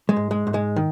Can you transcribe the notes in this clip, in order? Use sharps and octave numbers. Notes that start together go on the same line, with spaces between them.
G#3
G#2
G#3
G#2
G#3
D#3